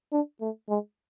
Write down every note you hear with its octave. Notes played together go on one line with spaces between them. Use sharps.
D4
A3
G#3